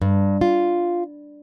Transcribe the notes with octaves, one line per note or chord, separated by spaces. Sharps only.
G2
F4